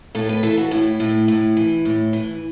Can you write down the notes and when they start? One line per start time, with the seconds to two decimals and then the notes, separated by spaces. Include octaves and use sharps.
0.15 A2 A4
0.29 B4
0.43 E3 A4
0.58 F#4
0.71 A2 E4
1.00 A2
1.28 A2
1.57 E3
1.85 A2
2.13 E3